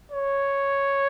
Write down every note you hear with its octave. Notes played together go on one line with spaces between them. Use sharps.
C#5